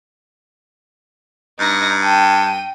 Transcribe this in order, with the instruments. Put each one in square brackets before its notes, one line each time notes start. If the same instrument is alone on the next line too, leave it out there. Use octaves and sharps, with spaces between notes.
[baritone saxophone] G2 [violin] D#4 A#6
[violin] G5 D#7 [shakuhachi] A5